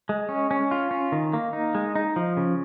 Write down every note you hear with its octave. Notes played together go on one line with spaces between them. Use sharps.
G#3
C#4
C#4
F4
C#4
D#3
A#3
D#4
G#3
D#4
F3
C#3